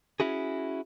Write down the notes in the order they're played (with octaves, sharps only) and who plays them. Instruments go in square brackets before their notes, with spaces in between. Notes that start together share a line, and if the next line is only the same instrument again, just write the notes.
[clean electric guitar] C#4 E4 F#4 G#4